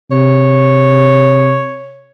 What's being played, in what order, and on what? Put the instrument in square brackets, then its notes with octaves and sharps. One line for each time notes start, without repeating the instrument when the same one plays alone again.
[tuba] C3 [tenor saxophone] C#5